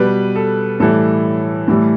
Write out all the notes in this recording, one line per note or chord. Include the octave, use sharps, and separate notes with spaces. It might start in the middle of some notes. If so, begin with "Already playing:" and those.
Already playing: B2 G3 B4
A4
A2 E3 G3 A4
A2 E3 G3